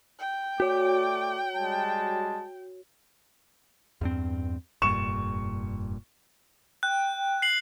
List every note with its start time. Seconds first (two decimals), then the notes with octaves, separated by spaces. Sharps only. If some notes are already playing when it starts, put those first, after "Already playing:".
0.19 G5
0.60 A3 F#4 C#5 D5 D6
1.55 G3 G#3 A5
4.01 E2 G2 C4
4.82 F1 G2 A#2 C#6 E7
6.83 G5 F#6
7.42 C7 F#7